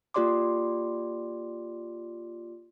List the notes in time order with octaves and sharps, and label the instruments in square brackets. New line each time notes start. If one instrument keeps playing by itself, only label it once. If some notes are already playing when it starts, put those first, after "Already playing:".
[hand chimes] A#3 F4 G4 D5 C6 D6